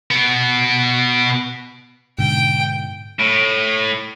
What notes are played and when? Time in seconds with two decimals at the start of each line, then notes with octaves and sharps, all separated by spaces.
0.11 B2 B3
2.19 G#2 B2 D3 G5
3.20 A2